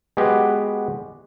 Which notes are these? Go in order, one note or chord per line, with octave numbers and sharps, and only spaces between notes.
G#3 B3 F#4 G4 B4